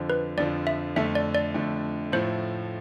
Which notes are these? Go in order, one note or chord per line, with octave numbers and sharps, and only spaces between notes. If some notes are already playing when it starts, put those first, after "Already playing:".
Already playing: F2 D3 F3
B4
F2 D3 F3 D5
E5
F2 D3 A3 E5
D5
D5
F2 D3 A3
A2 F3 A3 C5